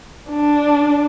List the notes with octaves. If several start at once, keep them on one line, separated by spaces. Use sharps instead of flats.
D4